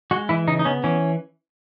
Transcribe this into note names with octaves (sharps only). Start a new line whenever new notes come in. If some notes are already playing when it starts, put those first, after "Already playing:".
G#3 F#4
E3 E4
C#3 D#4
D#4
B3 C#4
E3 C#4